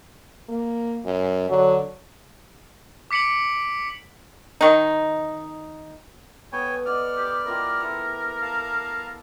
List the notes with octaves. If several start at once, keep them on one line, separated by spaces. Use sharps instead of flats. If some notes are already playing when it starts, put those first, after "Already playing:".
A#3
F#2
D3 F#3
D6 B6 C#7 D7 F#7
D#3 D#4
B3 A4 C#5 G5 G#5
D5 D#5 F#5 D6 F6
G4
E4 F4 G4 A#4
E4 A4
F5 A5 A#5